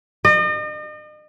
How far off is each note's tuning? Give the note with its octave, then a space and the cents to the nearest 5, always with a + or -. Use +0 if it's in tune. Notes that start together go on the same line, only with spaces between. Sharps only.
D#5 -40